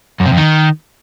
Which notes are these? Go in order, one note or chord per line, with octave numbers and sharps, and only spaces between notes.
F#2
C3
F2
D#3